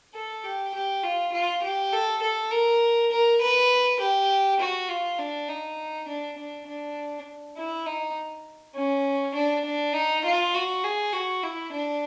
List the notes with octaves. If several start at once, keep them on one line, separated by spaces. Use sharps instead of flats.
A4
G4
G4
F4
F4
G4
A4
A4
A#4
A#4
B4
G4
F#4
F4
D4
D#4
D4
D4
D4
E4
D#4
C#4
D4
D4
D#4
F4
F#4
G#4
F#4
E4
D4